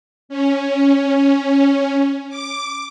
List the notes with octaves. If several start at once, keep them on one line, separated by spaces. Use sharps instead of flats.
C#4
D6